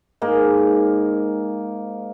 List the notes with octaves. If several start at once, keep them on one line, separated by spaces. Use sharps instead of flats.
G#2 A#3 A#5